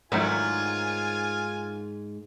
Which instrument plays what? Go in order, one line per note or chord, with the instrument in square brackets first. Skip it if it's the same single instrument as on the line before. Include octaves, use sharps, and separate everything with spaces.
[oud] G#2 [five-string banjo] D#3 F#3 E4 [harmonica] F4 G#5